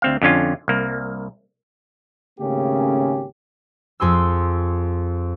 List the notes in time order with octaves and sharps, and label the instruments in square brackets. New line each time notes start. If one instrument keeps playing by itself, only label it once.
[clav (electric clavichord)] D2 C4 F5
F2 D3 C#4 F4
C2 A#3
[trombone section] G#1 C#3 A3 A#3 C#4 G4
[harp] F2 G#4 C6 E6